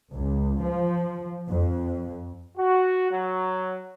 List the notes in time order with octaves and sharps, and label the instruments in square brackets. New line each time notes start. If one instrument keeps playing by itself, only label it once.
[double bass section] C#2
F3
F2
[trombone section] F#4
F#3